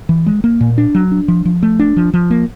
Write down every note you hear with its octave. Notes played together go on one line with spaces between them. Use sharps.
E3
G#3
A#3
A#2
D4
F#3
D4
F3
F3
A3
D4
F3
F3
A#3